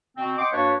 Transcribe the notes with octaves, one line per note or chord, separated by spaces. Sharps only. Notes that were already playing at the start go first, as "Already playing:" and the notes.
B2 C4
D#5 F#5 G5 C6 D6
G2 A#3 D4 F#4 B4 C#5